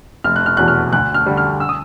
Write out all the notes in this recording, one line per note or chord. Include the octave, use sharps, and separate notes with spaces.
F1 F6
F#6
F6
E2 B2 F#3 F#6
F6
D2 F#6
F6
D3 G3
F6
E6
D#6